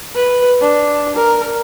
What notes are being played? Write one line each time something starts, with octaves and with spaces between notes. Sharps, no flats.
B4
D4
A#4